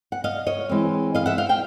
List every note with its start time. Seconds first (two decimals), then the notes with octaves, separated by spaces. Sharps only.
0.12 F#5
0.24 D#5 F5
0.46 C#5 D#5
0.69 E3 G#3 C4
1.15 D#5 F5
1.26 E5 F#5
1.38 F5 G5
1.49 F5 G5